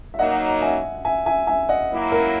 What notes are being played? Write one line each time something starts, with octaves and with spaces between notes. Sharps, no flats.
E5
F#3 A#3 D#4 D#5 F#5
E5 G#5
E5 G#5
E5 G#5
E5 G#5
D#5 F#5
F#3 A#3 E4
A#4